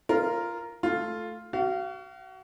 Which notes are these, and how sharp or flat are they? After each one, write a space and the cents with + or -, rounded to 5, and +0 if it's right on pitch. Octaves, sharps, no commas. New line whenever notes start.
F4 -15 A#4 +0
A3 +0 F4 +0
F#4 +30 F5 -20